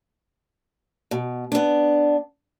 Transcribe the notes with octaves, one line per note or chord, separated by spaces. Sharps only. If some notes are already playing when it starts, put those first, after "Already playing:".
B2
B3 D4